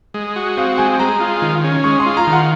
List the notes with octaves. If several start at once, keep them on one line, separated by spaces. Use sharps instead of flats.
G#3
F#4
C4 F5
G#3 G#5
G#3 A#5
F4
D#3
C#4
G#3 C#6
C6
F4
A#5
D#3
F#5